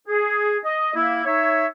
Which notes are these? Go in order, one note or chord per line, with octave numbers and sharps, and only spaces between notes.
G#4
D#5
A#3 E4
D#4 C#5 E5